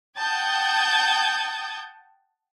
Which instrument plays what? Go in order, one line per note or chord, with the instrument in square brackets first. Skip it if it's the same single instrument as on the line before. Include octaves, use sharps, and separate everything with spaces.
[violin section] F#5 G5 A5 D#6 G6 G#6